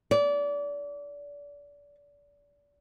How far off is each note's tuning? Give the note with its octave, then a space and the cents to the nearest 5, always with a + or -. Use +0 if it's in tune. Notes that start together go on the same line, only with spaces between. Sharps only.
D5 -30